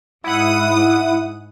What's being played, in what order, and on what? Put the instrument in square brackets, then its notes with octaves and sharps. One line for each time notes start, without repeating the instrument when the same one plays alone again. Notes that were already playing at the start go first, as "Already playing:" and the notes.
[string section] G#2 D#6 [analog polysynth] E4 F#5